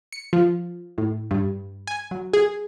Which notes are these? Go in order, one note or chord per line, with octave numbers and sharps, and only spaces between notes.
C#7
F3
A2
G2
G#5
F#3
G#4